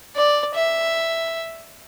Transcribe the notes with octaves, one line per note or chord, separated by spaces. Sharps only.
D5
E5